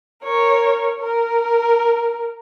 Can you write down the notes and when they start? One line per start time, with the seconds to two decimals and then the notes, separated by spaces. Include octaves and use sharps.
0.24 A#4 C#5
0.99 A#4